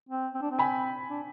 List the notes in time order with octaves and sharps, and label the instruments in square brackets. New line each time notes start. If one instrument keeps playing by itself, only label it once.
[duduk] C4
C4
D4
C4
[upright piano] G#5 B5
[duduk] D4